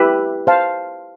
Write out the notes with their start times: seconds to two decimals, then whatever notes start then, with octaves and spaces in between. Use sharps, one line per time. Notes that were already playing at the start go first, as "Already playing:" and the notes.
Already playing: E4 G4 B4 E5
0.47 C5 F5 A5